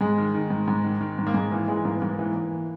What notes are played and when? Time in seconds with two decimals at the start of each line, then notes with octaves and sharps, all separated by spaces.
0.01 G#2 G#3
0.18 D#3
0.35 D#3
0.50 G#2
0.68 G#2
0.84 D#3
1.01 D#3
1.19 G#2
1.27 A#3
1.34 G#2 G#3
1.51 E3 A#3
1.68 E3 G#3
1.85 G#2 A#3
1.93 B3
2.01 G#2 A#3
2.19 E3
2.36 E3